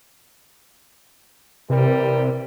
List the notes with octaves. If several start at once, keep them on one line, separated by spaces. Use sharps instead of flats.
C3 E3 G3 A#4